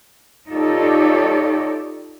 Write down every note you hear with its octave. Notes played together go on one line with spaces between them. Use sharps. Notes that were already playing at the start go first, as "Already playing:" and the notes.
D#4 F4 G4 A4 C#5 D5